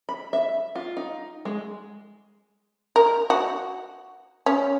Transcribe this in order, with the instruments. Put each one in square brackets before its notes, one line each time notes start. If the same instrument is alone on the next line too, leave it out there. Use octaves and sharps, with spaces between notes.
[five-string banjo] B5
E5
F4
D#4
G#3
[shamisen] A#4
F#4
C#4